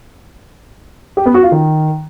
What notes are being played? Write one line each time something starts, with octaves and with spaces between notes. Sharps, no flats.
G4
B3
F#4
F4
D#3